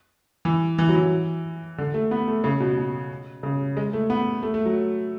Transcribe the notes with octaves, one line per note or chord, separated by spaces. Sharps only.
E3
E3
F#3
E3
D3
A3
B3
A3
C#3
B2
B2
C#3
G#3
A3
B3
A3
A3
F#3